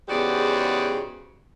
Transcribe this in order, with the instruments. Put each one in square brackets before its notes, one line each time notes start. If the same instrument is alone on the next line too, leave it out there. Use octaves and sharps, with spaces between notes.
[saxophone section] E2 G#2 C#3 F#4 G4 D5